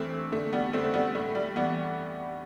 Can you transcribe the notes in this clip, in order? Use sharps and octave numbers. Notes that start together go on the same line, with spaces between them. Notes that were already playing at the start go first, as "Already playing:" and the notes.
Already playing: G2 E3 A3 C4
D3 A3
G3 B3
D3 A3 C4
A3
G3 B3
A2 A3
G3
E3 G3 B3